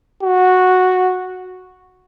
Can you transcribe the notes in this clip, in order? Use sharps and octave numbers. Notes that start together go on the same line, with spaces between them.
F#4